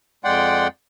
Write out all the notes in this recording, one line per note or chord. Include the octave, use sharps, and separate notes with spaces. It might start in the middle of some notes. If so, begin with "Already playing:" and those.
F2 G#3 D5 F#5 G5 C6